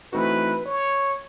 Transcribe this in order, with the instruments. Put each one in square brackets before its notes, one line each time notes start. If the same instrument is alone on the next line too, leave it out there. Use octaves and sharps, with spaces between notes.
[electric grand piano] E3 A3 C4 D#4 F#4 [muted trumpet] B4
[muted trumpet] C#5